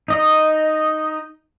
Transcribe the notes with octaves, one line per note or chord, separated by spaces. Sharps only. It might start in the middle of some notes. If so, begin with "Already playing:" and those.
D#4 D#5